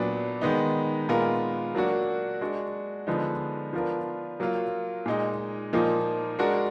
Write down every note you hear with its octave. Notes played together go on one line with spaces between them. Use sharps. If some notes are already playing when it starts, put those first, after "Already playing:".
Already playing: A#2 F#3 B3 D4
D#3 G#3 B3 D#4
A#2 G#3 B3 F4 A#4
F#3 A#3 D4 F#4
G#3 D4 F#4
D3 F3 G#3 B3 D#4
F3 B3 D4 F4 A#4
F#3 A#3 F4
A#2 G#3 D#4
A#2 F3 A#3 D#4
G#3 D4 F#4 A#4